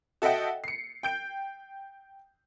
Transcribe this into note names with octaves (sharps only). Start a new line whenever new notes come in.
F#4 A4 D#5 E5 F#5 G5
C7 C#7
G5 G6 D7